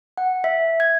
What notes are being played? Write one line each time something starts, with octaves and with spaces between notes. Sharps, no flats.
F#5
E5
G#6